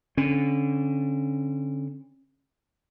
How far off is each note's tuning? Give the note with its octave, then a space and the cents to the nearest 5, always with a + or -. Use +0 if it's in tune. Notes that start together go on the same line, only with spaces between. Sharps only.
D3 -25 C#4 -40